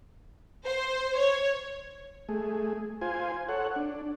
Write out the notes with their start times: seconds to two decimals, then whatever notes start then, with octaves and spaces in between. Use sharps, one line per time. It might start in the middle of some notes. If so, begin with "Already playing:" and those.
0.64 C5
1.19 C#5
2.29 A3 G#4
3.01 F4 C5 G#5
3.49 A4 C#5 F#5
3.76 D4